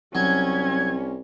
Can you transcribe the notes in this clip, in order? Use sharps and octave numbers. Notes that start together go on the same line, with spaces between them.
C2 F#3 C#4 G#6